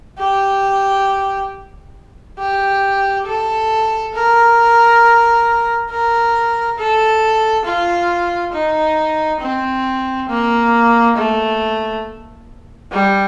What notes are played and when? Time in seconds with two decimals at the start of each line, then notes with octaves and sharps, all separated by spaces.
0.19 G4
2.39 G4
3.27 A4
4.14 A#4
5.90 A#4
6.78 A4
7.65 F4
8.53 D#4
9.41 C4
10.29 A#3
11.16 A3
12.92 G3